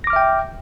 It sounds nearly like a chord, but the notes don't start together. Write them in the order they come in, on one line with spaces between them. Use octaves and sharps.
A#6 D6 F6 E5 G5